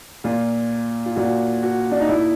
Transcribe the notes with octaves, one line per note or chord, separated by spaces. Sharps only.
A#2 F4
F4
A#2 F#4
F#4
D4
D#4
A#2 E4